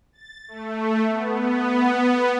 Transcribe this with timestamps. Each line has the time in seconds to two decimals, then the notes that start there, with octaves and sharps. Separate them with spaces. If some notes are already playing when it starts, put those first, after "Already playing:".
0.13 A6
0.48 A3
1.10 B3